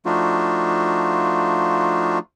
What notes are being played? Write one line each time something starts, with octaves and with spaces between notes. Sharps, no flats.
F3 A3 D4 D#4 F4 F#4